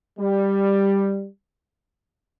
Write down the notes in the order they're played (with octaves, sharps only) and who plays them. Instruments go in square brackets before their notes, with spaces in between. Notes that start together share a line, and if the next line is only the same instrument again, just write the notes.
[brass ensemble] G3